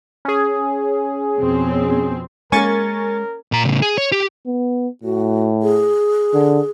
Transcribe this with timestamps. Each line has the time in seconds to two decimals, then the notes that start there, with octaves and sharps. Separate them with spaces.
0.25 C#4 G#4
1.39 F2 B2 C4
2.52 G#3 A#3 C#4 A#4 G#5 C#6 A6
3.52 A#2 A#5
3.64 A2 C#3
3.82 G#4
3.98 C#5
4.12 G4
4.47 B3
5.03 A2 F#4
5.63 G#4
6.34 D3